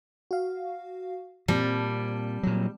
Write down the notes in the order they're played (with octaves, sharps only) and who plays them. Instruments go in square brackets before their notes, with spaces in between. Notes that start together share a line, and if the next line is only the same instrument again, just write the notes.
[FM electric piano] F#4 F5
[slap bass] A#2 [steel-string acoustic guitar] G3 [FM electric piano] C4 A5
[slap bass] A#2 F#3